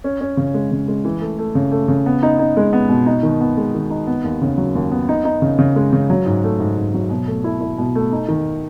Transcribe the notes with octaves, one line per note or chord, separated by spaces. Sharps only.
C#4
C#4
C#3
G#3
C#3
G#3
E3
A3
A3
C#3
A3
C#3
B3
D#4
D#4
G#3
B3
B2
D#4
D#3
B3
G#3
D#3
D#4
B3
D#2
C#3
F#3
D#2
B3
D#4
D#4
C#3
C#3
G#3
C#3
F#3
G#2
A3
G#2
G#2
F#3
B2
A3
E4
E4
B2
A3
D#4
D#3